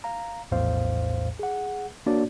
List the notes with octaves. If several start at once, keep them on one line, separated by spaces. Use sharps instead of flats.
F5 A#5
A#1 E2 A2 C5 F5
G#4 F#5
A#3 D4 F#4 C#5 D5